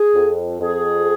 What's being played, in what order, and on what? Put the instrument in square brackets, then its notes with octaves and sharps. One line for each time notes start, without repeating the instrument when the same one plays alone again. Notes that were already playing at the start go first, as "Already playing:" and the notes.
Already playing: [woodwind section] G#4
F2
F2 G#4